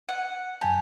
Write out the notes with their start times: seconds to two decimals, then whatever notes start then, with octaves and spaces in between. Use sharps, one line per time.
0.09 F#5
0.61 F#2 G4 G#5 A5